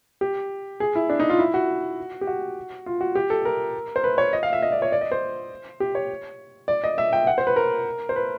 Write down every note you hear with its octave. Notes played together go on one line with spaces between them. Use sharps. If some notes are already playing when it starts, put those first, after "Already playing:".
G4
G#4
E4
D4
D#4
F4
E4
F#4
G4
F#4
F4
F#4
G4
A4
A#4
C5
B4
C#5
D#5
F5
E5
D#5
D5
C#5
D5
D#5
C5
G4
C#5
D5
D#5
E5
G5
F#5
C5
B4
A#4
C5
B4